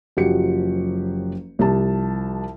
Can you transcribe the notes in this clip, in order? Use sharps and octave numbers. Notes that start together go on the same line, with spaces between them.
F#1 F3 F#3 F#4 G4 C#7
C2 F3 G4 A5